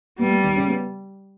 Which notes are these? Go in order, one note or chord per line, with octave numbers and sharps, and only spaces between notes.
G3 B3
B3
D#3
C#3
B3